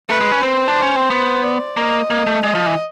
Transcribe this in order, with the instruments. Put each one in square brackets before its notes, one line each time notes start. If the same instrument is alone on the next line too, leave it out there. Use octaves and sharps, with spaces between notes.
[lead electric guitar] A3 [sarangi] B4
[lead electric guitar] G#3
C#4
[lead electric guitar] C4 [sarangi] C5
[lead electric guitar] D4
C#4
C4
B3
[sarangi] D5
[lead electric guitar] A#3 [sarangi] D#5
[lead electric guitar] A#3
A3
[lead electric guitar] G#3 [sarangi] D#5
[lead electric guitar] F3
E3